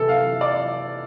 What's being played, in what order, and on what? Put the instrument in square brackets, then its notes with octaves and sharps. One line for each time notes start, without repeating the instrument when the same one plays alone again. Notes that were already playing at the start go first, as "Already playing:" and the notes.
Already playing: [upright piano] C3 E3 A4
F5
D5